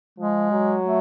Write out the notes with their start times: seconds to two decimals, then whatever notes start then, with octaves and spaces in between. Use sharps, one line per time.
0.19 F3 G#3
0.51 F#3
0.85 A3